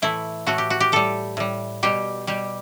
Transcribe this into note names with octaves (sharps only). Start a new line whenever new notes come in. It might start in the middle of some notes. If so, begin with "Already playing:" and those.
A2 E3 A3 E4
A2 E3 A3 F#4
G4
F#4
G4
A2 G3 A4
A2 G3
B2 G3 G4
B2 G3 G4